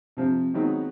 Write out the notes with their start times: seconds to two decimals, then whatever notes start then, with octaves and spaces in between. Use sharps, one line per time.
0.17 C3 F3 C4
0.54 D#3 F#3 G#3 B3 C4 D#4